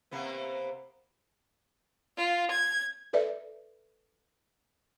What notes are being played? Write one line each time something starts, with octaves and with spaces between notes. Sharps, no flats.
C3 A#3 B3
F4
G#6
A4 B4 D5 E5